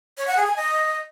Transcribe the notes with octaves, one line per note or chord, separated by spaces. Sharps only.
C#5
F#5
G#4
G#5
D#5